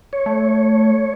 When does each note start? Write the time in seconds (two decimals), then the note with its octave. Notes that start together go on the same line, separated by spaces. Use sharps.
0.13 C#5
0.26 A3